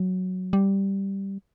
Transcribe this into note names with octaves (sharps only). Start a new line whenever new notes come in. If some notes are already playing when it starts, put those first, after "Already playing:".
Already playing: F#3
G3